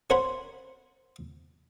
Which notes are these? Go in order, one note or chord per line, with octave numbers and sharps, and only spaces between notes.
C#4 A#4 C5 F#5 G#5 B5